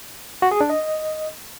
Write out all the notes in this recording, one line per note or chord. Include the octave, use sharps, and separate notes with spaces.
F#4
G#4
D4
D#5